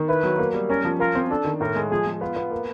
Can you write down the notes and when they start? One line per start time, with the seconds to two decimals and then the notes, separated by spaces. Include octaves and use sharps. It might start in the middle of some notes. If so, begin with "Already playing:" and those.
Already playing: D#3
0.08 E4 B4
0.23 F#3
0.39 A#3
0.54 G3
0.70 C#4 A#4
0.85 F3
1.00 F4 A#4
1.15 C4
1.31 D4 A4
1.45 D#3
1.61 A2 A#4
1.76 G#3
1.91 F3 G#4
2.06 F3
2.21 B3 F4
2.36 B3
2.51 A#3